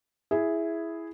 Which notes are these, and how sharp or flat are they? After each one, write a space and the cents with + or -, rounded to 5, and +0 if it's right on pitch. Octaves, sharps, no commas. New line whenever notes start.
E4 +0 G#4 +0